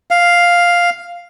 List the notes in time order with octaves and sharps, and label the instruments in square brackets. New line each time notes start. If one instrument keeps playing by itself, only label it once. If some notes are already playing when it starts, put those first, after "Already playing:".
[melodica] F5